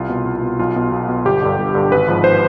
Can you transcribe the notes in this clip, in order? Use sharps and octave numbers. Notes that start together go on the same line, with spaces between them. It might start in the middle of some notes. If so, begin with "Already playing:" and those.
Already playing: C2 F4
B2
C2
B2
B1 F4
B2
B1
B2
G1 G4
G2 D3
G1
G2 D3
G#1 B4
G#2 F3
C5